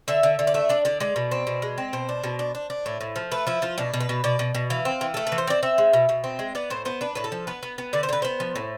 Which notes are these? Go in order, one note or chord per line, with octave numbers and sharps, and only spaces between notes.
D3 E5
D3
D3
D5
A3 E5
D4 D5
D3 D5
G#3 D5
B2
C4
B2
G#3
C4
B2 C5
D4
B2
D4
D4
D4
A2
A2
F3
A3 B4
F3 E4
F3 F4
B2 D4
B2
B4
B2
B2 D5
B2
B2
E3 F5
C4
E3
A3 A4
B4
E3
C5
C4 D5
C4 E5
G#3
B2
B2
C4
G#3
B3 D5
A2 C5
B3 C5
D4 B4
A2 B4
A4
F3
B3 B4
B3
B3
D3 D5
C5
D3 B4
B3 C5
F3
A2